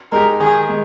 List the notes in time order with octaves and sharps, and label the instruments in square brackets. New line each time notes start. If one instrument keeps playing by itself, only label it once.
[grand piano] G#3 D#4 G4 [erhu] A#4
[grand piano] D#3 [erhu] G#4
[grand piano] G#3